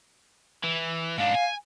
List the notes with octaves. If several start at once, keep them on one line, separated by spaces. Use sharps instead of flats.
E3
G#2 D4 F5
G#5